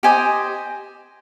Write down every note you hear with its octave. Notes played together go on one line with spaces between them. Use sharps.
G4 C5 D#5 G#5